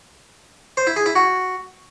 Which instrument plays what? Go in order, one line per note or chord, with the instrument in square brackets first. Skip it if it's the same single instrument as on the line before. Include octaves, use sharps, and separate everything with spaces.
[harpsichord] C5
E4
G#4
E4
F#4